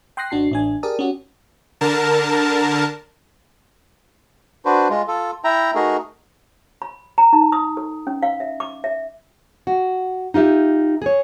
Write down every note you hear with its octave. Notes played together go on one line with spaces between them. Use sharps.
G5 C6 D#6 F#6 A#6 C7
G#1 D4 F#4 A5 C7
A1 D4 G#5
G4 G#4 A#4 D5 A5 D#6
C#4 F#4 G4
D3 A#4 A5
D4 F#4 B4 C5
G#3 F4
F4 A4
E4 E5 G5 A#5
A3 D#4 F#4 G#4 A#4
B5
A#5
D#4
D#6
A4
C#4
F5
E5
D6
E5
F#4
D#4 F4 G4 E5
G#4 C#5